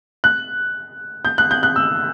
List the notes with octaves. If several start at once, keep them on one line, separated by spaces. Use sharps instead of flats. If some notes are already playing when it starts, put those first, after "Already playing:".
F#6
G6
F#6
G6
F#6
E6